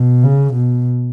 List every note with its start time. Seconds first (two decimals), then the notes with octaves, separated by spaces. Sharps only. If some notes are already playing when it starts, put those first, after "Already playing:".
Already playing: B2
0.24 C#3
0.54 B2